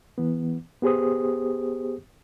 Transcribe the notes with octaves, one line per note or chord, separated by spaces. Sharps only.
E3 B3
B3 G4 G#4 C5 D#6